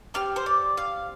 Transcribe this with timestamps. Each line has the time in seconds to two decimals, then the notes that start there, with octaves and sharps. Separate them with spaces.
0.14 C4 G4 F6
0.36 C5
0.46 D5
0.77 F5